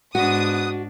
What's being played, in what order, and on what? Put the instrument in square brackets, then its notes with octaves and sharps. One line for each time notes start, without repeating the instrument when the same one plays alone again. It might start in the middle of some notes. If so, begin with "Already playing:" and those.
[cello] G#2 D4 [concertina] B3 F#6 [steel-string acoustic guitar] F#4 [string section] D#6